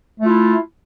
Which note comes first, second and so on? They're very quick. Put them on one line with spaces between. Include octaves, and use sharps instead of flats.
A3 F4 E4